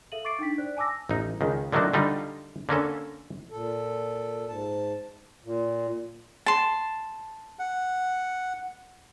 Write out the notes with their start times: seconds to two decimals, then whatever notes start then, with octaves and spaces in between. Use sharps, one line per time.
0.12 A4 E5 F5 D#7 F#7
0.25 C#6 D6 A6 C7 D7
0.39 D4 D#4 G5 B6
0.58 C5 D5 F#6
0.77 G#5 A5 D6 E6 A#6
1.09 A1 D#4
1.41 C#2 D#3
1.72 D3 D#3 F#3 A3 D4 F#4
1.94 D3 G3 D#4 F4
2.69 D3 A#3 C#4 A4
3.51 A#2 A4
4.49 G#2 A5
5.45 A#2
6.46 A5 C6
7.59 F#5